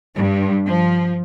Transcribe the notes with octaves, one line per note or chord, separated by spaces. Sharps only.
G2
F3